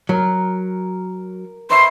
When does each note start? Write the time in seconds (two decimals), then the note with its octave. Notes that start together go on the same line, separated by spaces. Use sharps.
0.09 F#3 A#4
1.70 B4 C#5 E5 C6